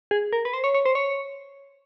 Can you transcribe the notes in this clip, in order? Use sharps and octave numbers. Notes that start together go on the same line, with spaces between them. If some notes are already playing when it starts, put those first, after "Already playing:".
G#4
A#4
B4
C5
C#5
C#5
C5
C#5